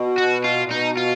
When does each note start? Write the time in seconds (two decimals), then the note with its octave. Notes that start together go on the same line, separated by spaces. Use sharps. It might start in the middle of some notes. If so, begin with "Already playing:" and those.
Already playing: B2
0.18 F#4
0.44 F4
0.66 A#2
0.71 B2 D#4
0.97 F4